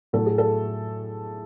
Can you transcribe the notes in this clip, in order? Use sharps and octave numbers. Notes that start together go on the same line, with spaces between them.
A2 F#3 A3 A4
G#4
A4